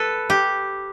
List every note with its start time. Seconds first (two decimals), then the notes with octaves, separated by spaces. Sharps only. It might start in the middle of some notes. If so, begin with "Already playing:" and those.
Already playing: A4 B4
0.30 G4